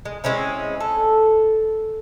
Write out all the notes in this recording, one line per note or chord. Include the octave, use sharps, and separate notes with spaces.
G#3
G#3 C4 C#4 E4
A4